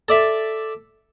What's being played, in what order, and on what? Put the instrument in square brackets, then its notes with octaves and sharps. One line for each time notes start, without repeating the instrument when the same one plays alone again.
[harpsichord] A4 D5 E5